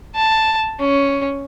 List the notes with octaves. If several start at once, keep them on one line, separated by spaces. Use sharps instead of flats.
A5
C#4